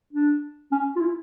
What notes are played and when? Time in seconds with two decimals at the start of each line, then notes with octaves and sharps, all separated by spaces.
0.13 D4
0.72 C#4
0.96 F4
1.01 E4